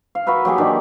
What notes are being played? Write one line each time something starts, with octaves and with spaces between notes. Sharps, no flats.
F5
F#4 A#4 B4 E5
F#3 A#3 G4 G#4
D#3 E3 D4 E4